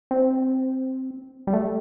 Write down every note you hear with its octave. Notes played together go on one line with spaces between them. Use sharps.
C4
G3
A3